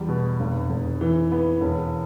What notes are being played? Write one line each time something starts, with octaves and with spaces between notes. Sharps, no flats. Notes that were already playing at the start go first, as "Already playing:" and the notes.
Already playing: E2 G3
B2
F1
F1
E3
B3
E1